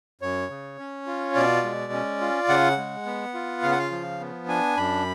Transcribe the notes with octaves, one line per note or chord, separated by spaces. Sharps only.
F#2 C#5
C#3
C#4
F4
B2 D5
G#3
C#4
F4
C#3 F#5
G#3
B3
F4
C#3 F5
F#5
F5
F3
B3
D4 G#5
F#2 B5